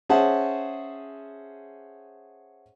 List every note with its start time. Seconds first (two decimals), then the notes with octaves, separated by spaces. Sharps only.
0.09 C#4 G#4 C5 E5 F#5 A5